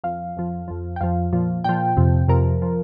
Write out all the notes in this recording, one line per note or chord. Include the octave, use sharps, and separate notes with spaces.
F2 F3 F5
F2 F3
F2 F3
G5
F2 F3 F5
A#2 F3
A#2 F3 G5
F2 C3 F3
F2 C3 F3 A#4
F3